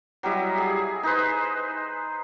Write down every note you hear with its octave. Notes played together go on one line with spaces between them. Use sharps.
F#3 G3 E4 D#5
G#4
D#4 G#4 B4 C5